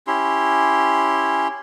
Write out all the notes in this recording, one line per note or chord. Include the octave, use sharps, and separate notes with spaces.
C#4 E4 G4 C6